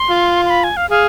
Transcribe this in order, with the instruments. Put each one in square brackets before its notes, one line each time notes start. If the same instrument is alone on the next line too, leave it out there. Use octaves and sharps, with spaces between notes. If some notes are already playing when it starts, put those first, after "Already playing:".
Already playing: [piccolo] C6
[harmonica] F4
[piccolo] C6
B5
G#5
F5
[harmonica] G#4 [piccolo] F5